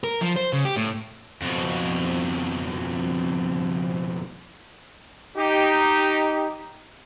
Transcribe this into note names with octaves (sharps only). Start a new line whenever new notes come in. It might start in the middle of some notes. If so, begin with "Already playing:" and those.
A#4
F3
C5
C#3
G4
A2
F2 B2
D#4 G4